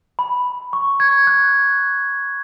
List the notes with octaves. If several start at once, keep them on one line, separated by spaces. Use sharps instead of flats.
B5
C#6
G#6
F#6